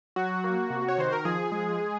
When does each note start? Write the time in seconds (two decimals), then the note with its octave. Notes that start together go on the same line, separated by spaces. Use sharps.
0.16 F#3 F#4
0.44 A#3
0.70 C3
0.88 C#5
0.98 D#3 C5
1.12 A#4
1.25 F3 G#4
1.52 G#3